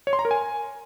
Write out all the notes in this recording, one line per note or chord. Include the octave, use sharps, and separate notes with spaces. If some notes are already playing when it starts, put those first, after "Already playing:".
C#5
C6
A#5
A#4
G#5